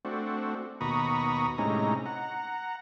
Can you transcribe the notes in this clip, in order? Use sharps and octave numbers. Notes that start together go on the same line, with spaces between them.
A3 C4 D4 F#4
D#2 B2 A#5 B5 C#6 D#6
A2 C3 G#3 C#4 D#4 A#5
F#5 A#5